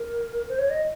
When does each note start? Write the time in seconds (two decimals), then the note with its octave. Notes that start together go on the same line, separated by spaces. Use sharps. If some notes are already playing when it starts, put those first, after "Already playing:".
Already playing: A#4
0.49 C5
0.59 C#5
0.70 D#5